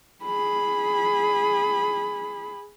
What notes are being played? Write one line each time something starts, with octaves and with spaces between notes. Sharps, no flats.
G#4 B5